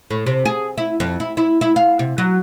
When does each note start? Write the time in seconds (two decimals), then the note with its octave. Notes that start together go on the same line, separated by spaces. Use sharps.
0.10 A2
0.26 C3
0.46 G#4
0.78 E4
1.00 F2
1.20 E4
1.37 E4
1.61 E4
1.76 F5
1.99 C3
2.18 F#3